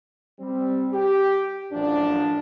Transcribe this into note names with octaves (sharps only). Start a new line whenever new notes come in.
G3 C4
G4
A1 F#2 F3 D4